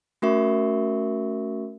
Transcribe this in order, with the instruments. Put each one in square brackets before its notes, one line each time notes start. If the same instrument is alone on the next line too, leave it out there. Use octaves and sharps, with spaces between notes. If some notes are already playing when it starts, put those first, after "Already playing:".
[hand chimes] A3 C#4 F#4 A#4 E5 C#6